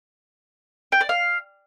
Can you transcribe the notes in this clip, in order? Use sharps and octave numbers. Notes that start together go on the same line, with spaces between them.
G5
D5
F5